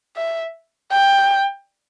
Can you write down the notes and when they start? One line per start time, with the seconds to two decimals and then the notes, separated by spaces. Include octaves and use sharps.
0.17 E5
0.92 G5